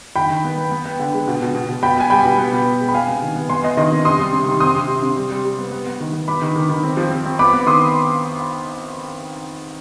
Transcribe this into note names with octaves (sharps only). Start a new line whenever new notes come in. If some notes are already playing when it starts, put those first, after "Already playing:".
D#3 G5 B5
D#3
B3
B3
B3
B3
D3
G#3
B2
B2
B2
B2
B2 G5 B5
B3 G#5
G3 G5 B5
B2
B3
B2
B2
G#3
B5
B3 F5 G#5
C3
D#3
B3
B3 G#5 C6
B3 D#5
D#3 D#5
C3
C3 C6 D#6
G3
C3
D#3
C4 C6 D#6
C3
C3
C3
G3
G3
G3
B3
B3
B3
D#3
B3
B3 B5 D6
D#3
D#3
D#3
C4
F3
C4
C4
B3 B5 D6
B3
D#3 C6 D#6